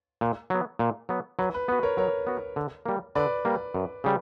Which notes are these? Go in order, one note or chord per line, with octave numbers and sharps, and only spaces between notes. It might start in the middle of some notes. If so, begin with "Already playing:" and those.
A#2
F#3 B3
A#2
F#3 B3
F#3 B4
B4
B3 F#4 B4
A#4 C#5
F#3 A#4 C#5
B3 F#4
D3
G3 A#3
D3 B4 D5
G3 A#3
F#2
C#3 G3